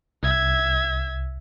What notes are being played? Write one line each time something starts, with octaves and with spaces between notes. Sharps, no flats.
C2 E5 G#6